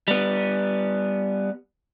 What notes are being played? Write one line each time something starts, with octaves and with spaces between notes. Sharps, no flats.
G3 B3